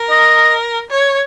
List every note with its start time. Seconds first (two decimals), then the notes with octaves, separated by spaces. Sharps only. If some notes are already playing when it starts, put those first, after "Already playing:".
Already playing: A#4
0.11 D#5
0.90 C#5